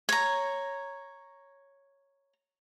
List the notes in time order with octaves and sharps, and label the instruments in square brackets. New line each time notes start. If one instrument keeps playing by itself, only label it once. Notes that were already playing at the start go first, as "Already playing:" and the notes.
[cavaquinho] C#5 A#5